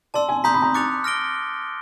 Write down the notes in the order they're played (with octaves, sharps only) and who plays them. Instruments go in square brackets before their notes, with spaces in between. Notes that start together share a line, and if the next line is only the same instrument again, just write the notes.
[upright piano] D5 [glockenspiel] A5 C6 E6
[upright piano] G#5
[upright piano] A#5 [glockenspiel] C6 D#6 G6 B6
[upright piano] B5
A#5
[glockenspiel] D6 F#6 A6 C#7 F7
F6 A#6 D7 G7